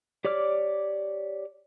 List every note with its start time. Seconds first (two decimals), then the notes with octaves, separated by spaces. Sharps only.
0.25 G4 C#5 D5 D6 F6